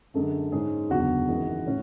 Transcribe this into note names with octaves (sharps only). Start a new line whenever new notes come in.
F#2 D3 G#3 A4
G#2 G#3 C#4 G#4
F#1 E2 D3 F#4
G#1 F#2 E3 G#3
A2 C#4